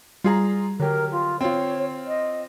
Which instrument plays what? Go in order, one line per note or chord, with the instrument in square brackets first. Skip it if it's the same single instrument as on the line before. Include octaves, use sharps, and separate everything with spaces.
[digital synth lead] G3 [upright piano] F4 G#4 A#5
[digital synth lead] D3 [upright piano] F#3 G4 [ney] A#4
[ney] F4
[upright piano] C4 F4 [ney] C#5
[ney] D#5